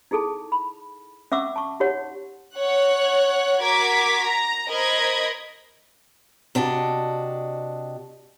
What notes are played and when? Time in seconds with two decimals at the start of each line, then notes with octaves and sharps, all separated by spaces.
0.11 D#4 E4 G#4 A4 A5
0.52 B5
1.32 C#4 E5 F#5 C#6 D6 E6
1.56 A5 C#6
1.80 D#4 F#4 G4 C#5 F#5
2.55 C#5 F#5 F#6
3.61 F#4 A#4 D6 G#6 B6
4.23 A#5
4.67 A#4 C5 D#5 B5 G#6
6.55 C3 D4 F#4 D#5